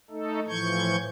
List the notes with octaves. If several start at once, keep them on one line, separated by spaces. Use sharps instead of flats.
A3 D#4 A4
A2 E3 F3 C#6 G6 G#6